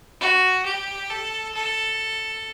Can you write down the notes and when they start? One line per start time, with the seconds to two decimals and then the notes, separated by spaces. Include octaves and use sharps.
0.21 F#4
0.65 G4
1.10 A4
1.54 A4